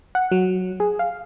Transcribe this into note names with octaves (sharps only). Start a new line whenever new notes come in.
F#5
F#3
G#4
F5